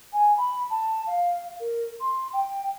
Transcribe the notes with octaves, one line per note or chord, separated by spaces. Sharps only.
G#5
B5
A5
F5
A#4
C6
G5